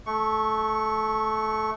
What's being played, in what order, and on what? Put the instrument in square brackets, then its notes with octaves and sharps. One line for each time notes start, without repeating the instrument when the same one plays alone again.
[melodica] A3 C#6